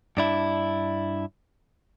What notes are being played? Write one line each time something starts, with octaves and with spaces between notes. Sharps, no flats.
G2 D4 E4